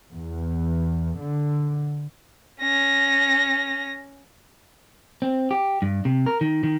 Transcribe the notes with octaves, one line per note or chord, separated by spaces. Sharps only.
E2
D3
C#4 A#6
C4
G4
G2
C3
A#4
D#3
D#3